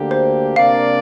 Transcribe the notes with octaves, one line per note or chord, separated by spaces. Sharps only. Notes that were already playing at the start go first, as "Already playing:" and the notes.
Already playing: D2 D3 A#3 G4
C5
C3 A#3 D4 A#4 D5 F5